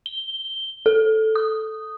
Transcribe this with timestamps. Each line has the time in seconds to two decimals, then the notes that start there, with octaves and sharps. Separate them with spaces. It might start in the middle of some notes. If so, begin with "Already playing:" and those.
0.06 G7
0.86 A4
1.35 D#6